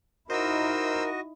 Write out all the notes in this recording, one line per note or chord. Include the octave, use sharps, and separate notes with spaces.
D#4 E4 F#4 A#4 C5 D#5 E6